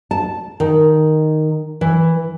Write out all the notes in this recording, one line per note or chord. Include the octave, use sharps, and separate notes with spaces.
A5
D#3
E3